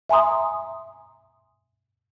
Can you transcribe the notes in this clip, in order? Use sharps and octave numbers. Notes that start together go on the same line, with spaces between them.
E5 G#5 A#5 C6 D#6